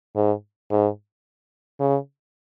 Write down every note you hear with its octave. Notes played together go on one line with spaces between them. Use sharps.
G#2
G#2
C#3